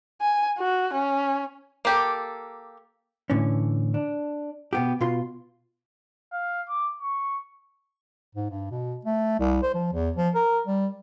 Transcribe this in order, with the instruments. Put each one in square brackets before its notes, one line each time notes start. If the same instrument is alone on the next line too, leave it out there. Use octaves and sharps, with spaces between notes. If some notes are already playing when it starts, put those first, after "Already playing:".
[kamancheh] G#5
F#4
C#4
[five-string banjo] A#3 G4 A4
[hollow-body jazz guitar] A2 D3 E3 C#4
D4
B2 B3 G4
B2 F4 C6
[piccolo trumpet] F5
D6
C#6
[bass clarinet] G#2
G2
B2
A3
C2
C5
F3
E2
F3
A#4
G3